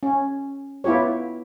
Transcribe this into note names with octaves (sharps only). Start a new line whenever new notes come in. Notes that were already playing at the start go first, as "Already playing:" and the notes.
C#4
B3 E4 F4 G4 C#5